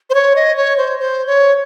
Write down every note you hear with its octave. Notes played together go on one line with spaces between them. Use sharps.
C5
C#5
D#5
C#5
C5
C5
C#5